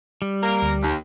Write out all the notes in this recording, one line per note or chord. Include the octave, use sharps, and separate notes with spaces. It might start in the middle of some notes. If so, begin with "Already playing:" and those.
G3
A#3 A#4
D2
D#2